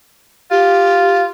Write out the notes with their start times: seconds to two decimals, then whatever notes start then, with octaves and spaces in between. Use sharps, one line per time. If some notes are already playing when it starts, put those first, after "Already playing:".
0.51 F4 G4